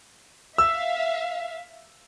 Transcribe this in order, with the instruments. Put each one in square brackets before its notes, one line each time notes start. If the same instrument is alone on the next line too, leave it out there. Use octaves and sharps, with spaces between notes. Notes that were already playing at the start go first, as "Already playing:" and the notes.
[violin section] E5 F5 [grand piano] E6